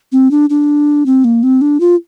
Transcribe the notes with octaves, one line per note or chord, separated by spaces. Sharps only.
C4
D4
D4
C4
A#3
C4
D4
F4